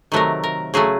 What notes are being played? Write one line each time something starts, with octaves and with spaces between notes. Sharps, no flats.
C3 D#3 F#3 A3 A#4
A#4
C#3 F#3 A3 G#4